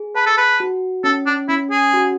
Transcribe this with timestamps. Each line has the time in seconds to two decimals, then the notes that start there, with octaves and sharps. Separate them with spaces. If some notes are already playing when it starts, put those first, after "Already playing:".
Already playing: G#4
0.15 B4 A5
0.26 A4
0.38 B4
0.60 F#4
1.04 C#4 A4
1.26 D4
1.48 C#4 E4
1.71 G#4
1.93 F#4